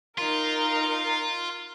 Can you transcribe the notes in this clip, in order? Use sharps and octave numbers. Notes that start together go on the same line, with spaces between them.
D#4 F4 A#4